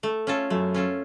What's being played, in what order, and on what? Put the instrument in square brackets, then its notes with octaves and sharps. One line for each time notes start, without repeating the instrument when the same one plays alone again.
[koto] A3
C#4 F4 A4
[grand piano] F#2 [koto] A3
[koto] C#4 F4 A4